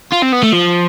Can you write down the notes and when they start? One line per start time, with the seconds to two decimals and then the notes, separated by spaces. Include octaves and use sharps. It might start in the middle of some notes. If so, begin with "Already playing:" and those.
0.13 F4
0.23 C4
0.33 B3
0.43 A3
0.53 F3